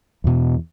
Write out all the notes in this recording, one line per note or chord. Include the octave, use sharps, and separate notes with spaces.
E2 B2